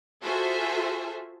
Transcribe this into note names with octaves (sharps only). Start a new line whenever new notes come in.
F4 F#4 G#4 A4 C5 E5